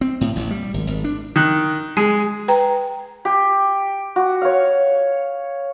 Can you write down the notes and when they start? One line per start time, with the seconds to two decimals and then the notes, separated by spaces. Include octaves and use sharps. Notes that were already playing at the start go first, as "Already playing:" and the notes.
0.01 C4
0.21 A2
0.36 A1
0.51 G3
0.74 G#1
0.87 G#1
1.04 D4
1.36 D#3 F#6
1.97 G#3
2.48 B4 G5 A#5
3.25 G4
4.16 F#4
4.42 C#5 F5